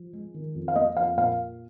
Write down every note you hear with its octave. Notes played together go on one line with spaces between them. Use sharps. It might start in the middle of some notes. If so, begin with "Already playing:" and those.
Already playing: F3
G#3
D#3
F2
F5
A#3 D#5
F2 F5
A#2 F5